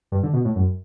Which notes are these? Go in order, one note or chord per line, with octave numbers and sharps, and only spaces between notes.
G2
D3
B2
A2
F#2